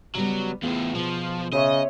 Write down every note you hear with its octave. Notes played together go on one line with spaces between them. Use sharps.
C#3 F#3 G3 B3
E2 A2 B3 F4 G#4
B2 F3
C#3 C5 C#5 D#5 E5